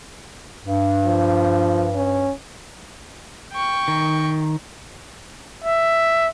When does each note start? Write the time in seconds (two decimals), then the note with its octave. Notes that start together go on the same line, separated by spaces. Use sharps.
0.65 G2
1.05 F3
1.95 C#4
3.52 G5 C#6
3.88 D#3
5.64 E5